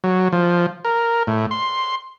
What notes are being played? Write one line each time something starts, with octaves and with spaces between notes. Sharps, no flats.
F#3
F3
A#4
A2
C6